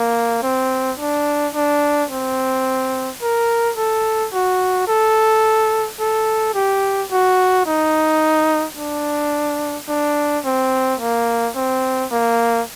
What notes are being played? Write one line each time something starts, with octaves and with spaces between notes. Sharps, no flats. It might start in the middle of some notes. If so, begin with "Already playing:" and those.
Already playing: A#3
C4
D4
D4
C4
A#4
A4
F#4
A4
A4
G4
F#4
D#4
D4
D4
C4
A#3
C4
A#3